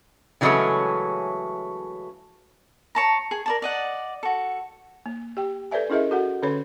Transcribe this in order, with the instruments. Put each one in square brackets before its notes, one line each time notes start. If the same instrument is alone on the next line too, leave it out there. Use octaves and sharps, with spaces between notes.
[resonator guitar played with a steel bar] C#3 E3 F#3 G#3 A3 C#4
[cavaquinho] C#5 A5 A#5
G#4
A#4 D5 A5
D5 D#5 F#5
F#4 A4
[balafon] A#3
G4 G5
A4 B4 C5 D5 E5 G#5
C#4 E4 G#4 A#4 D#5 E5
F#4 A4 F#5
D3 C#4 A4 B4 C#5 B5